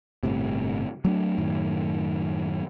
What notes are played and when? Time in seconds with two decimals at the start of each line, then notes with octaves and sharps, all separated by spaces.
0.23 G1 A2 C3
1.05 F#3 A3 D4
1.38 F#2 A2 D#3